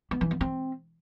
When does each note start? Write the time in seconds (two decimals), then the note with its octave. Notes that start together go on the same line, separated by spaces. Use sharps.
0.11 B3
0.21 E3
0.31 B3
0.41 C4